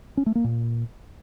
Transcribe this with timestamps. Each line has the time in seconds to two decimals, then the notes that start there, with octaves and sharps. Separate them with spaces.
0.17 C#4
0.26 A3
0.35 A#3
0.44 A#2